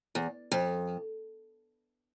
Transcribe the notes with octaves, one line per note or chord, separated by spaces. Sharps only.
E2
F2